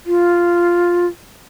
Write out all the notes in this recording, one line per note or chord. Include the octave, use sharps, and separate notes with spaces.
F4